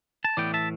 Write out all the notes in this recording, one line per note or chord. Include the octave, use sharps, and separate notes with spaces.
A5
A2 E3 B3 D5 G5
E5 A5